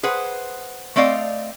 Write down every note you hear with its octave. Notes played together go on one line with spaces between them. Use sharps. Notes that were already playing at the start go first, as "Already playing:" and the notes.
G#4 B4 C5 F#5
A3 C4 D5 D#5 F5